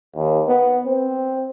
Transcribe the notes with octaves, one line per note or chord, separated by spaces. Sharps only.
D#2
B3
C4